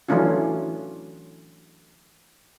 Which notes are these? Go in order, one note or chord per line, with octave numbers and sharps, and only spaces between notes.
E3 F#3 A3 C#4 D4 F4